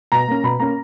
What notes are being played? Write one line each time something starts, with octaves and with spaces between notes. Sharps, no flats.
B2 A#5
A#3 C#4
B2 B5
A#3 C#4 A#5